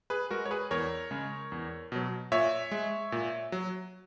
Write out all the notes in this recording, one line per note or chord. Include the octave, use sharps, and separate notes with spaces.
G#4 B4
G#3 F#4 A#4
C#5
G#4 B4
E2 A#4 C#5
C#3 G#3
E2
B2 F#3
A#2 C#5 E5
G#3
A#2
F#3